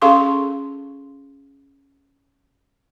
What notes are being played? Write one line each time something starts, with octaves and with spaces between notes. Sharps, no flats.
C#4 G#4 A4 F5 C6 C#6